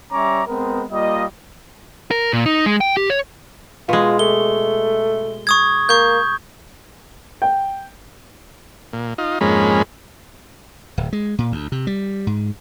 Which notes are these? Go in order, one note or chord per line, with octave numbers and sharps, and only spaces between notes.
G3 C#4 C#5 E5 A#5 D6
G#3 B3 C4 A#4
G3 A#3 F4 D#5
A#4
A#2
D#4
G#3
G5
G4
C#5
B2 G#3 F4
A3 G7
C#6 D#6 G#6
A#3 C#6 G6
G5
A#2
D#4 F4
F2 G#2 G#3 A#3 C#4 B5
D1
G#3
A#2
D2
C3
G3
G#2